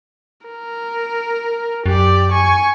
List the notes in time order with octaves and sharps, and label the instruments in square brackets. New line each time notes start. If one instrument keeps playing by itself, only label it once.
[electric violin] A#4
[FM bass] F#2 [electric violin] G4 D5
[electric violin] G#5 C#6